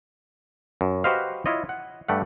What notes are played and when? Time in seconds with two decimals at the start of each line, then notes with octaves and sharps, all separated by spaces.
0.81 F#2
1.04 F#4 G4 B4 C5 D#5 F5
1.46 E4 F4 C#5 D#5
1.69 F#5
2.08 G2 A3 G4 F#5